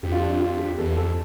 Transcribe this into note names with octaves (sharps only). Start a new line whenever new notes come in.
F2 G4
F4
D4
G4
F4
G4
E2 A4
F2 A4